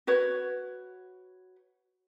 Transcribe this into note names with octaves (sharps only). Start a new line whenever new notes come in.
F#4 B4 C#5